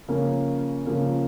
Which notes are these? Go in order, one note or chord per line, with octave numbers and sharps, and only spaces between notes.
C#3 F3 A#3 C#4
C#3 F3 A#3 C#4